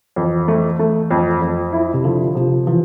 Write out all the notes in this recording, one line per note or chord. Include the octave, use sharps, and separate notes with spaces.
F2 E3
A3
A3
F2
F2
E4
C3
D3 F3
C3 F3
E3 F3